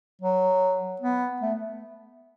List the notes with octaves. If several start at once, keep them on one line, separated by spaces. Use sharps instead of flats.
F#3
B3
A3